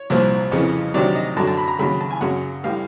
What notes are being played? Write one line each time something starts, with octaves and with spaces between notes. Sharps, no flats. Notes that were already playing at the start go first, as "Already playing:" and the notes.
Already playing: C#5
C2 A#2 F3
F2 C#3 E3
D2 C3 D#3 F#3 D5
D#5
F#2 D3 F#3 A5
A5
B5
A#5
D#2 C#3 F#3 B5
A5
G#5
F#2 C#3 F#3 F#5
A2 E3 G3 F5